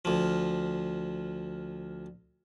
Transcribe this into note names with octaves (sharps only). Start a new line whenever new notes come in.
D2 F3